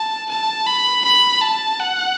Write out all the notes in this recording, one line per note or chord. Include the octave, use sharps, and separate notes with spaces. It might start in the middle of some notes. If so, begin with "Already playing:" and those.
Already playing: A5
A5
B5
B5
A5
F#5